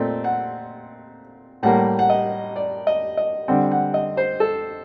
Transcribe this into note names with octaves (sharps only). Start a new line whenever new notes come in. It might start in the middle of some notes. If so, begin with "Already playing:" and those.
Already playing: A#2 A3 C4 D#5
F#5
A2 G3 A#3 F#5
F#5
D#5
D5
D#5
D#5
D3 G3 C4 F#5
F#5
D#5
C5
A4